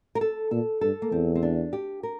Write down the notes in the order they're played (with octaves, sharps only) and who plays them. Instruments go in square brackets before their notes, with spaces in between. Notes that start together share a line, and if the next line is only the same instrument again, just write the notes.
[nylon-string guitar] A#4
A4
[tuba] A#2 [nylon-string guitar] A4
[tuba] G2 [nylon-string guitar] A4
[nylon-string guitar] A#3
[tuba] E2 [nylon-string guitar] C4
[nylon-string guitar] C4
D4
G4
A#4